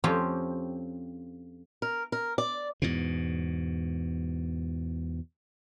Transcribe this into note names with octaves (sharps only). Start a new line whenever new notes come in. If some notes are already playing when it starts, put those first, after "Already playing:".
F2 F3 C4 C#4 G4
A#4
A#4
D5
E2 G#2 B2